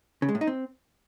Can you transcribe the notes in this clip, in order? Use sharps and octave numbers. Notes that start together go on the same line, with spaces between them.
C#3
G#3
A2
D#4
C4